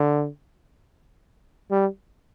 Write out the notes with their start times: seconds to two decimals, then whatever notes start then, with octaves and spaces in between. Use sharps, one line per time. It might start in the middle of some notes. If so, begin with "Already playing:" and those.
Already playing: D3
1.71 G3